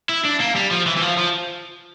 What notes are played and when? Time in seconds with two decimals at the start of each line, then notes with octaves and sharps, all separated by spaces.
0.09 E4
0.25 D4
0.40 A#3
0.56 G3
0.71 F3
0.86 E3
0.97 E3
1.02 F3
1.17 F3